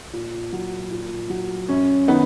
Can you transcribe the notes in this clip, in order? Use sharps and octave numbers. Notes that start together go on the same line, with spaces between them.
A#2
F#3
A#2
F#3
F#2 C#4
D#3 B3 D#4